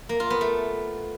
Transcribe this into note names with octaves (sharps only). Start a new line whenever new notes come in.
A#3
F4
B3
A3